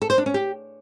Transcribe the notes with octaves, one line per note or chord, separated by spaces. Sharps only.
A4
C5
D4
C#4
G4